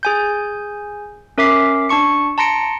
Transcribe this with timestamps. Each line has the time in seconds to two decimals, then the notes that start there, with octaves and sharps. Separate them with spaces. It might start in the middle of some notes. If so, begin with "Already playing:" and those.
0.03 G#4 G#5 G6
1.38 C#4 A#4 E5 D6 B6 C7
1.89 D4 A5 C#6 C#7
2.38 A5 A#5 C6 A#6 C#7 D7